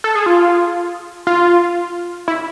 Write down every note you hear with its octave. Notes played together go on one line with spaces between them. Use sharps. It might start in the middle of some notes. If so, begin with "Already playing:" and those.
A4
G#4
F4
F4
E4